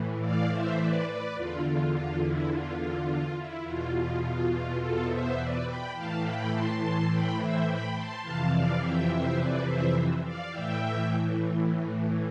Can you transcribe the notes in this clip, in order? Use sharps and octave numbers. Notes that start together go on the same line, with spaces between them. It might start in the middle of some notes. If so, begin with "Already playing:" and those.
Already playing: A2 E3
D5 F5
C5 E5
B4 D5
B4 D5
E2 D3 F4
F4
F4
E4
F4
F4
F4
E4
E2 B2 F4
F4
F4
F4
F4 A4
C5 E5
B4 D5
G5 B5
A2 E3 F5 A5
G5 B5
A5 C6
A5 C6
G5 B5
C5 E5
G5 B5
A5 C6
F2 C3 E3 F5 A5
D5 F5
E5 G5
C5 E5
B4 D5
C5 E5
D5 F5
A2 E3 E5 G5